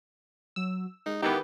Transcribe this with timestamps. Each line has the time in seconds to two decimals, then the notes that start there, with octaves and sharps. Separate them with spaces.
0.56 F#3 E6
1.06 G#3 D#4
1.22 D#3 E3 B3 G4